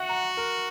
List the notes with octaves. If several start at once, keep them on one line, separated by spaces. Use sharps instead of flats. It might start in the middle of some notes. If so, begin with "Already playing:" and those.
Already playing: F#4 E5 F#5
A#5
A#4